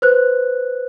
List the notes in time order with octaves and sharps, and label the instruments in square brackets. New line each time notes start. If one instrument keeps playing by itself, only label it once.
[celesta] B4 C5 F#6